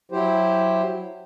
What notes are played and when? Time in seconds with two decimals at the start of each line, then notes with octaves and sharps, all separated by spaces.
0.12 F#3 E4 G4 C5